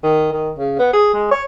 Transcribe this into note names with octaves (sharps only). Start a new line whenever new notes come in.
D#3
D#3
C#3
B3
G#4
G#3
C#5